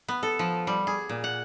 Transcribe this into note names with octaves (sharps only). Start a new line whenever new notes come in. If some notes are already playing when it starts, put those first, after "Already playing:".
B3
A4
F3
G3
G#4
A#2
F#5